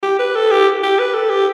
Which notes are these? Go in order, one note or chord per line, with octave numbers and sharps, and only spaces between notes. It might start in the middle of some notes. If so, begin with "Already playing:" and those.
G4
B4
A4
G4
G4
B4
A4
G4